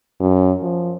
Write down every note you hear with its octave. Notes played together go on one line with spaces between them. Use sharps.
F#2
F3